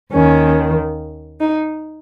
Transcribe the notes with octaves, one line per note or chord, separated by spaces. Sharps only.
D#2 D#3 C#4
D#4